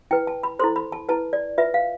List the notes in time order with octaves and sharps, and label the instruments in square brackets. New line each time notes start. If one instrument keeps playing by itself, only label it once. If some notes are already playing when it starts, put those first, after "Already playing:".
[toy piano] E4 B4 G5
A5
B5
E4 A4 C5 C6
B5
A5
E4 B4 A5
D5
F4 B4 E5
F5